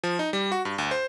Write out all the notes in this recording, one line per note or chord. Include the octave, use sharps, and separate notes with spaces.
F3
D#4
G3
F#4
G2
D2
C5